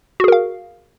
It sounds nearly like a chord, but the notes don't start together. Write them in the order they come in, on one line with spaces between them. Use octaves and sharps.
F#4 G#4 A#4 F5